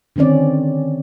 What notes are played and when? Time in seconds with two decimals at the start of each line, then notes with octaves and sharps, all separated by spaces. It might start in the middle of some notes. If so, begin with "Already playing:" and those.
0.16 D3 D#3 C4 C#4 D5